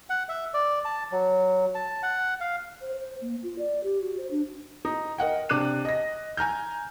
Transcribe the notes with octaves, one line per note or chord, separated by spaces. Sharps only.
F#5
E5
D5
A5
F#3
A5
F#5
F5
C5
C5
A#3
F4
D5
G4
F#4
C5
D4
D#4
A#4 D#5 F#5 G5
C3 D4 D6 F#6 D#7
D#5 A#6
G#5 A#5 F6 G6